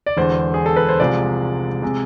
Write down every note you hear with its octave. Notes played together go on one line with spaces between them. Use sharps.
D5
E1 E2 D3 C5
G#4
A4
B4
C5
C2 C3 F3 G#3 D5
C3 G#3